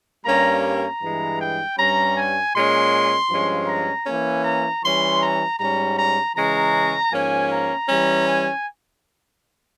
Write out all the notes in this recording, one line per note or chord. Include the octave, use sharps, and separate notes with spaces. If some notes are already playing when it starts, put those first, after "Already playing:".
G2 G3 A#3 C#4 A#5
A#5
G2 E3 G#3
G5
G2 G3 C#4 A#5
G#5
A#2 G#3 C#4 C6
G2 F3 G#3 C#4
A#5
E3 A#3 C#4 G#5
A#5
E3 G3 C#4 C6
A#5
G#2 G3 C#4 A#5
A#5
C#3 E3 G#3 C#4 A#5
G#2 F3 A#3 C#4 G#5
A#5
E3 G3 C#4
G#5